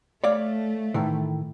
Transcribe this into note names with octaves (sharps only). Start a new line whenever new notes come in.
A3 C#5 D5 F5
A2 D#3 E3